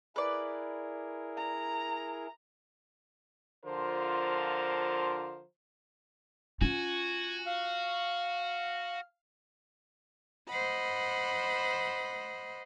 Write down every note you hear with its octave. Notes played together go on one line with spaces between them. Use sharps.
E4 G#4 A#4 B4 D5
A#5
D3 F3 F4 A#4 C5
C#4 F4 F#4 G#5
F5
C5 D#5 F#5 B5